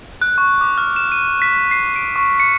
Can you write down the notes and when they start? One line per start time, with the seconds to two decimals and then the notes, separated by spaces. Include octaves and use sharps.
0.21 F#6
0.38 C#6
0.61 D6
0.78 F6
0.96 E7
1.12 D#7
1.42 B6
1.71 C7
1.96 D7
2.16 C#6
2.40 C#7